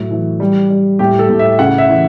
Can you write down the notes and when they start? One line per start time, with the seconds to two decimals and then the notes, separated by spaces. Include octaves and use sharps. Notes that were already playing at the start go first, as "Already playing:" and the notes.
Already playing: A2 F#3
0.11 E3
0.40 G3
0.70 G3
0.99 A2 G4
1.19 A4
1.30 A2
1.39 E5
1.59 C#3 F#5
1.78 E5
1.89 E3